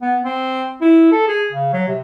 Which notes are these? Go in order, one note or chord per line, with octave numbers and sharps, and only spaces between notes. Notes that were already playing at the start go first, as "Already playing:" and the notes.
B3
C4
E4
A4
G#4
C#3
F#3
C3